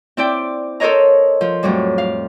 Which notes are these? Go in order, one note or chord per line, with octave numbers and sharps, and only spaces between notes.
C4 E4 D5 G5
A4 A#4 C5 C#5 D#5 A#5
F3
F2 A2 F#3 G3
F5